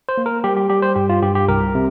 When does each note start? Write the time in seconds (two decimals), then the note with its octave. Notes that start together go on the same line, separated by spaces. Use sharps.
0.09 C5
0.18 A#3
0.26 A#4
0.44 G3 G4
0.57 G4
0.70 G3 G4
0.82 C5
0.95 G2 G4
1.09 F4
1.22 G2 G4
1.35 G4
1.48 C2 A#4
1.75 C3